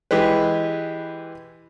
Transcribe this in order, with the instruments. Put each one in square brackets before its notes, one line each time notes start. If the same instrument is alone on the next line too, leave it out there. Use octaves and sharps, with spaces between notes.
[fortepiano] E3 G#3 G4 B4